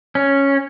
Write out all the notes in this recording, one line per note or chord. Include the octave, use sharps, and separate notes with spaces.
C#4